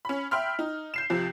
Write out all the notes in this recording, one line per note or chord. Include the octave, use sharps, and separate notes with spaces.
C#4 B5
E5 G5 B5 C6 F6
D#4
G6 C7 E7
F2 C3 F3